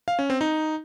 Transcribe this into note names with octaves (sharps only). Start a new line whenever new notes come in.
F5
C#4
C4
D#4